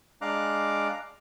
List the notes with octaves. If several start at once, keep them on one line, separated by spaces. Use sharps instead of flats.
G#3 D4 F5 A#5 D6 F#6